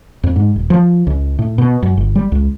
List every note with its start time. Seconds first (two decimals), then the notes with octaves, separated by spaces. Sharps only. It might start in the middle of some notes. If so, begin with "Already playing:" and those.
0.23 F2
0.36 G#2
0.56 D#1
0.70 F3
1.07 C#2
1.39 A2
1.58 B2
1.83 F#2
1.97 G1
2.15 G3
2.32 C#2